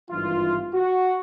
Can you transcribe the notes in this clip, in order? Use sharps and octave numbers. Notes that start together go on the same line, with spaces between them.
G#1 G2 E3 F4
F#4